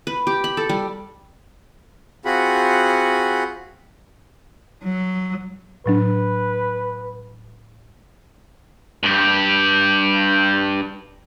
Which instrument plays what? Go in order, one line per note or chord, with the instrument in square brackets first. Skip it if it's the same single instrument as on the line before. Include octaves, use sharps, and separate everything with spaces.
[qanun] B4
G4
B5
A4
G3
[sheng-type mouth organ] C4 F4 F#4 G#4 F#5 B5
[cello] F#3
[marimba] A2 F#3 D4 [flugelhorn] B4
[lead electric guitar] G2 G4